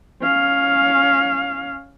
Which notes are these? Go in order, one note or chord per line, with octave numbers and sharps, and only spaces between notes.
C#4 F5